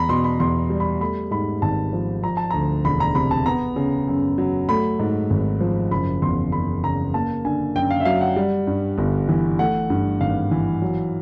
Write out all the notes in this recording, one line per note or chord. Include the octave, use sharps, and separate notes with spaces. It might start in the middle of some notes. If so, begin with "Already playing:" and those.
Already playing: E2 A#5 B5
B2 C6
B5
E2 C6
G3
B5
A3 B5
G#2 B5
G#1 A5
F3
F3 A#5
A5
D2 A#5
E1 B5
A#5
C3 B5
A5
B3 A#5
C#3
F#2
F#3
A3 B5
G#2
G#1
F3
F#1 B5
E2 C6
F#1 B5
C#3 A#5
A#3 A5
D3 G#5
F#2 G5
F5
E5
F#3 F5
F#5
G3
G2
G1
E3
A3 F#5
G2
G#1 F5
E3
F#3